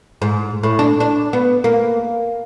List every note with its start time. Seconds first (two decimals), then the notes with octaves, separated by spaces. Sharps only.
0.22 G#2
0.63 A2
0.79 D4
1.00 D4
1.33 B3
1.64 A#3